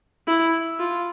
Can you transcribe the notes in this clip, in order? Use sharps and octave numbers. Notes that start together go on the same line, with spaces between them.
E4
F4